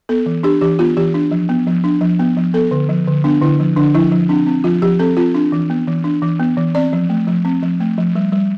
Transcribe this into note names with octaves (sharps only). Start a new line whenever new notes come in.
B3 A4
E3
D4 G4
E3 G4
B3 F4
E3 G4
D4
F3
B3
F3
D4
F3
B3
F3
B3 A4
D3
F3
D3
B3 D4
D3 E4
F3
D3 D4
F3 E4
F3
C4 D4
C4
F3 F4
F3 G4
C4 A4
C4 F4
D4
E3
B3
E3
D4
E3
B3
E3
C4 D5
F3
A3
F3
C4
F3
A3
F3
G3
G3